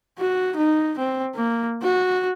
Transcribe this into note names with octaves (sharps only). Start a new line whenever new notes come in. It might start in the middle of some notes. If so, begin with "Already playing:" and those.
F#4
D#4
C4
A#3
F#4